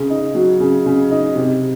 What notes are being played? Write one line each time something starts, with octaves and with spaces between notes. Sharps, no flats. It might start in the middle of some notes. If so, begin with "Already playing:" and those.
Already playing: C#3
D#4
F#3
C#3
C#3
D#4
C3